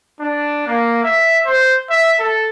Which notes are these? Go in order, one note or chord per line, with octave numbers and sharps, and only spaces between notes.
D4
A#3
E5
C5
E5
A4